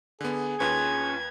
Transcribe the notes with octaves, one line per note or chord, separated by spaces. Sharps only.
D3 B3 G#4
D#2 C#4 F4 B4 G#6